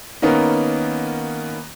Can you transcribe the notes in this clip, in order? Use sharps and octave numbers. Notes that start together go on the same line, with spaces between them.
D#3 A#3 B3 C#4 D#4